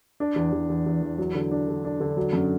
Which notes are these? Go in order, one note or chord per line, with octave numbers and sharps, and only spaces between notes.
D4
E2
E2
E2
E2
E2
F#3
D3
D4
D3
D4
D3
F#3
F#2